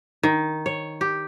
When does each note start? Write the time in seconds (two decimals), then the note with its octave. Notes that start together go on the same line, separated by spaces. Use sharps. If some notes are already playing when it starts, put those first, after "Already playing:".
0.23 D#3
0.66 C#5
1.01 G4